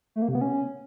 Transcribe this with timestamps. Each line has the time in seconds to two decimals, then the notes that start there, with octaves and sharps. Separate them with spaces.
0.16 A3
0.22 A#3
0.28 C3
0.35 B3
0.41 C#4